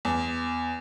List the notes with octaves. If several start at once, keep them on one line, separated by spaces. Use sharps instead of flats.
E2